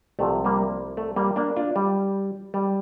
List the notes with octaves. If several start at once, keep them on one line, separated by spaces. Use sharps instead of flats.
C2 C3 F3 A3
G3 A#3
A3
G3 A#3
A#3 D4
D4 F4
G3
G3